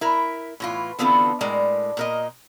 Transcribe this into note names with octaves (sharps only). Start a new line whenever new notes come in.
E4 A#4
A2 E3 F4
D3 E3 B3 C4 F4 A4
A2 G#3 A#4 D5
A#2 A#4 D#5